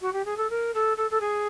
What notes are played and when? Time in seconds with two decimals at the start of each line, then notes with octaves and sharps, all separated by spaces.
0.01 F#4
0.13 G4
0.25 G#4
0.37 A4
0.50 A#4
0.74 A4
0.97 A4
1.11 A4
1.21 G#4